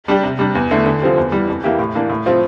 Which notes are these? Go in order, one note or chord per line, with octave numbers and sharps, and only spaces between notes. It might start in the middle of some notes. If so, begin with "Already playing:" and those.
G3 D4 G4
C3
G3 D4
E2
D3 A3 E4
D3
F3 C4 G4
E2
E3 G3
F2
E3 A#3 E4 G4
A2
E3 A#3 D4
A2
F3 C4 F4